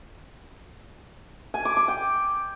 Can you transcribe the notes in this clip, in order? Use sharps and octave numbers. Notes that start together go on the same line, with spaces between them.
G#5
D6
D6
G5